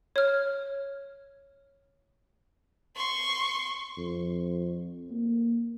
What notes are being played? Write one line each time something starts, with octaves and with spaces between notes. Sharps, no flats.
C#5 F6
C6 C#6
F2
A#3